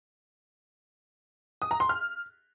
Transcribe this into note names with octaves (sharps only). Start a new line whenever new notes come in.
D#6
A#5
C6
F6